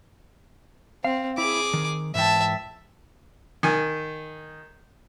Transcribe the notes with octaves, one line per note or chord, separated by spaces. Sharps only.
C4 F5
E4 G#4 D6
D#3
G#2 E3 E5 G5 A5
D#3 G#5